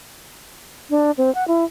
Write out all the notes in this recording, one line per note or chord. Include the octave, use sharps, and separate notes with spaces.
D4
C4
F#5
E4